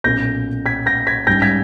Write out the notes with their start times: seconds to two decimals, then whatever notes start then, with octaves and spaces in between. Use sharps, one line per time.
0.04 B1 A#2 A#3 C#4 G6 A#6
0.66 G#6 B6
0.86 G6 A#6
1.07 G#6 B6
1.27 G#2 G3 C#4 G6 A#6
1.42 G#6 B6